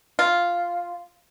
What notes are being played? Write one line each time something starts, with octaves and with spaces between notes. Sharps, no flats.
F4